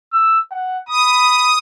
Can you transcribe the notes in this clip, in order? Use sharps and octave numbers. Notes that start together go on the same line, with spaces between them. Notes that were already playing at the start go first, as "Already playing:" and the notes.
E6
F#5
B5 D#6